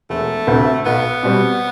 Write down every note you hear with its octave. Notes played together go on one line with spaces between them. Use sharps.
E1 A3
D2 C3
B1 B3
B2 G3 C4